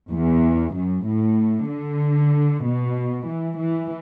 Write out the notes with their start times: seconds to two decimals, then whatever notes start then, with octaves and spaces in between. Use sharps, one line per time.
0.10 E2
0.75 F#2
1.06 A2
1.69 D3
2.65 B2
3.27 E3
3.60 E3